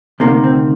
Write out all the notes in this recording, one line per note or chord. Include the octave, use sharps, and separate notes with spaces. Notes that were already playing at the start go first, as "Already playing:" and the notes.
D2 C3 D#3 A#3
C4